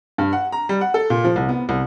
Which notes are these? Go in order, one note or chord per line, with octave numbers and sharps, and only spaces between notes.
G2
F#5
A#5
G3
F#5
A4
A#2
F3
C2
B3
C2